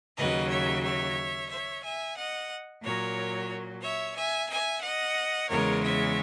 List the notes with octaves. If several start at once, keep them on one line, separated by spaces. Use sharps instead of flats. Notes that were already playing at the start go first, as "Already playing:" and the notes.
D#2 C#3 F#3 B4 D#5
C#5 E5
C#5 E5
C#5 E5
E5 G#5
D#5 F#5
A#2 F#3 A#4 C#5
C#5 E5
E5 G#5
E5 G#5
D#5 F#5
E2 C#3 G#3 A#4 C#5
C#5 E5